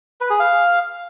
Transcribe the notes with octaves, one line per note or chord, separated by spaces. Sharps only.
B4
G#4
F5